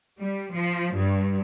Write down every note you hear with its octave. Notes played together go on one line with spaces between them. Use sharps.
G3
F3
G2